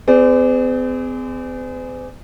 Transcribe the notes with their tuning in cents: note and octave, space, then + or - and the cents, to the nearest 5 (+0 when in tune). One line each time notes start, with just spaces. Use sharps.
C4 -45 G#4 +0 D5 +0